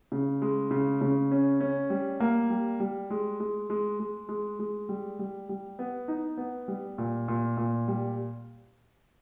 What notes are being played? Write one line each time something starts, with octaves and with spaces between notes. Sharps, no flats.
C#3
G#3
C#3
C#3
C#4
C#4
G3
A#3
G3
G3
G#3
G#3
G#3
G#3
G#3
G#3
G3
G3
G3
B3
D#4
B3
G3
A#2
A#2
A#2
G3